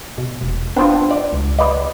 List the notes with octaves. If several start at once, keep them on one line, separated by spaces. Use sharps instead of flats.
B2
E1
B3 C4 D4 F4
D5
C#2
B4 D5 D#5